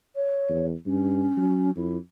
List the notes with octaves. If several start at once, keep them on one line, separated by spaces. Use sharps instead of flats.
C#5
E2
G2 C#4
F#3
F2 E4